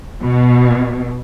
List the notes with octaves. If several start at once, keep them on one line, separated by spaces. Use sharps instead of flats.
B2